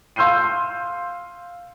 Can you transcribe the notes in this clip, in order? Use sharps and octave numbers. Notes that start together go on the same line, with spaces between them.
F5 C6 E6 G6 C7 D#7